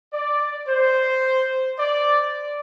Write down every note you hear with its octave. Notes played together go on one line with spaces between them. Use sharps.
D5
C5
D5